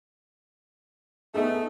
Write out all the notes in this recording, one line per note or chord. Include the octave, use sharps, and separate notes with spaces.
A3 B3 D#4 G#4